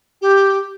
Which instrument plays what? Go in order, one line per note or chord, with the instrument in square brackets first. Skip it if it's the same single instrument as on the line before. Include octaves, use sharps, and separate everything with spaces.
[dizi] G4